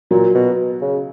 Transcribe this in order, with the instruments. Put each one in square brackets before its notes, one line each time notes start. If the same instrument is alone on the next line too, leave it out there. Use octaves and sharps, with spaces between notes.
[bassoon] A#2 [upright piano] F#3
[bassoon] B2
C#3